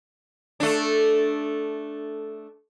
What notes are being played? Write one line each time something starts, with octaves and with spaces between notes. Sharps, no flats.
A3 D4